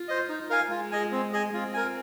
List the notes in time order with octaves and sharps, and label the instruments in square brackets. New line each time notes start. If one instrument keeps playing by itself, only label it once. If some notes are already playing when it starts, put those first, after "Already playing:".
Already playing: [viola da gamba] F4
[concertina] C5 D#5
D#4
A#4 F5 G#5
[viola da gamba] G#3 [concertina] F4
[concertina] G#4 D#5 G#5
C4
G#4 D#5 G#5
[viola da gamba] C4 [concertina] F4
[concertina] A#4 G#5